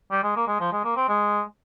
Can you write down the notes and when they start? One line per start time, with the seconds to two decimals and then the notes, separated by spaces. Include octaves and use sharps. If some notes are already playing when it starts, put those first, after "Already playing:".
0.11 G3
0.23 G#3
0.36 A#3
0.48 G#3
0.60 F3
0.72 G#3
0.84 A#3
0.96 C4
1.08 G#3